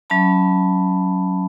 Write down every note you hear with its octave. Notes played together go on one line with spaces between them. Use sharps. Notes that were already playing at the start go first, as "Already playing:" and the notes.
F#3 C#4 E5 A5 B5